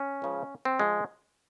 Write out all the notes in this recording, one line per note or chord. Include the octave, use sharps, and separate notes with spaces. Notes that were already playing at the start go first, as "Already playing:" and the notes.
Already playing: C#4
C#2 C#3 F3
C4
F3 G#3